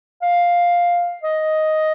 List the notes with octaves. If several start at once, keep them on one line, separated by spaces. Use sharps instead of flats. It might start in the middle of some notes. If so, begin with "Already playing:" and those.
F5
D#5